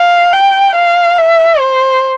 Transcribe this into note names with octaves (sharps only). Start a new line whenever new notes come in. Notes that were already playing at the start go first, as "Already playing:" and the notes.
Already playing: F5
G5
F5
E5
C5